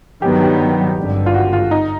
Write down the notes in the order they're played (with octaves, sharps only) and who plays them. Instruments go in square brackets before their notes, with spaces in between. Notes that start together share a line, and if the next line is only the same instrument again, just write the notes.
[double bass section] G2 D#3 F#3 B3 [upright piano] G4
[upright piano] G4
[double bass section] G#1 G2 D3
[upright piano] F4
F#4
F4
D#4